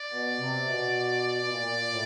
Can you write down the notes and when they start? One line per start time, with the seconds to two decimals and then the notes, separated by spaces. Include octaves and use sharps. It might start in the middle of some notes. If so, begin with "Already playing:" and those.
Already playing: D5
0.10 B2
0.37 C3
0.66 B2
1.43 B2
1.49 A#2
1.90 A2